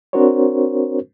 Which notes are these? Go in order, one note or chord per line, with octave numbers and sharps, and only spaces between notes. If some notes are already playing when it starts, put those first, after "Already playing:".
C4 D4 F#4 A#4 C5 C#5